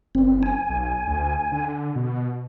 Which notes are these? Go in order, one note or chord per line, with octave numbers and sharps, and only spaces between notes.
F#1 C4
G#5
B1
D2
D3
B2